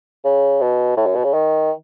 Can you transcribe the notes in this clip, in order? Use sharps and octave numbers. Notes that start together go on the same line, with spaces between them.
C#3
B2
A2
F#2
B2
C#3
D#3